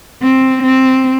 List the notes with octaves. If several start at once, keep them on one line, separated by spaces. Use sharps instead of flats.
C4
C4